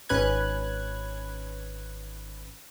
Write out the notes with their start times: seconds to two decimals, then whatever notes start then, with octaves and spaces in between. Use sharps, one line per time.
0.09 G#1 C#4 B4 F#6 G#6